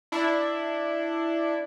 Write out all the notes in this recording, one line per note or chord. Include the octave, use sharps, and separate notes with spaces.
D4 E4